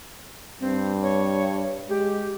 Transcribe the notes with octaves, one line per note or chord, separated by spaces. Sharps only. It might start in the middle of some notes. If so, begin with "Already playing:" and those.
G2 C4
C#5
G#3 G4